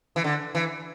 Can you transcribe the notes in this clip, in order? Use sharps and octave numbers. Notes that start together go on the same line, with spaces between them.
E3
D3
E3